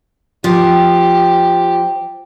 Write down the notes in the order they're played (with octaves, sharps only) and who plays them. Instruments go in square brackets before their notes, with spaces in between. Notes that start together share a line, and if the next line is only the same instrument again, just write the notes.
[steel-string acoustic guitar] F3 [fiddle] G4